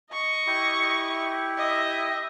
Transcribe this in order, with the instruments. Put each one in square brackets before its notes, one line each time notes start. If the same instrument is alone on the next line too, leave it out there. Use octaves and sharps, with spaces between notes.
[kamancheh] D#5 C#6
[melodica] E4 G4
[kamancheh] D#5 E5